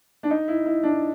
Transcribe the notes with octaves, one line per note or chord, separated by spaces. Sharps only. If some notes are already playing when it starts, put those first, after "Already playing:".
D4
D#4
E4
E4
D4